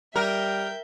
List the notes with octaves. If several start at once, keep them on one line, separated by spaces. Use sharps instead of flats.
G3 A#4 E5 G5 G6